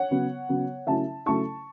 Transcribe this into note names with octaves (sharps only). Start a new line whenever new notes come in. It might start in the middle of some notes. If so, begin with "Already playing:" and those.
Already playing: C#5 F#5
C#3 F#3 B3
C#3 F#3 B3
C#3 F#3 A3 C#4 E4 E5 A5
C#3 F#3 A3 C#4 E4 A5 C#6